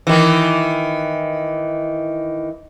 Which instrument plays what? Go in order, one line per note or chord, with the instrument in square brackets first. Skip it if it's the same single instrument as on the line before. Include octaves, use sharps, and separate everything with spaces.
[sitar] D#3 E3